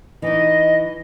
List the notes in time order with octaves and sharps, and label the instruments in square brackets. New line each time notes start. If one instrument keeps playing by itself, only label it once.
[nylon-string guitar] E3 D#4 [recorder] D#5